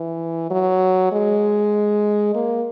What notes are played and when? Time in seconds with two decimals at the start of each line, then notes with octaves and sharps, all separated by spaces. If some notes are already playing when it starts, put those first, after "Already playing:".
Already playing: E3
0.51 F#3
1.12 G#3
2.35 A#3